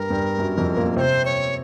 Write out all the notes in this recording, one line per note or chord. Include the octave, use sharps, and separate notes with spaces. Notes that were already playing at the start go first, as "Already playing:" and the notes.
Already playing: G2 G3 A#4
G2 G3
F#2 F#3
F2 F3
A#2 A#3
C3 C4 C5 C#5
C#5